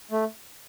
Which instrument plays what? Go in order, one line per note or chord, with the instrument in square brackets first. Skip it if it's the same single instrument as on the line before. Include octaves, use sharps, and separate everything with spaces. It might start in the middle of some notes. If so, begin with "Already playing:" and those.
[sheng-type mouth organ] A3